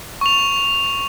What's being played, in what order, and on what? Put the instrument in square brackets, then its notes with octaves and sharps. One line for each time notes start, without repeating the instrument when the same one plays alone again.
[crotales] C#6 F7